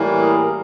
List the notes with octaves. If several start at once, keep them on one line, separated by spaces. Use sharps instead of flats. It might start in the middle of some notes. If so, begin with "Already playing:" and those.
Already playing: A2 E3 G3 A#3
G#4 A#4